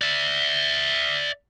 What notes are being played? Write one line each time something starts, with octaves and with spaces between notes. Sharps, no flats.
D5 E5